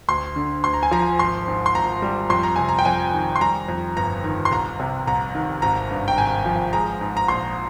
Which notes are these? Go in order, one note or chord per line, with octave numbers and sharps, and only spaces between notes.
D2 C6
D3
D2 C6
A#5
G#5
F3 A#5
G#1 C6
G#2
C6
G#1 A#5
G3
F2 C6
A#5
C3 G#5
A#5
G5
F2 G#5
D#3
C6
G3 A#5
F2
G1 A#5
D#3
C6
C2 A#5
C3
C2 A#5
D#3
G#1 A#5
G2
G5
G#1 G#5
F3
G#3 A#5
G#2
A#5
A#1 C6